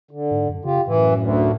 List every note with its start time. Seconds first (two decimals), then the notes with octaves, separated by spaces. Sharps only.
0.11 D3
0.31 G#2
0.49 F#2
0.65 C#3 F4 G4
0.88 F#2 A2 E3
1.22 D2